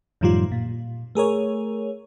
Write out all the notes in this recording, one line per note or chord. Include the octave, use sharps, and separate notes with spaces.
F#2 A2 D#3 F3 G3 F4
A#2
A3 G#4 A#4 C#5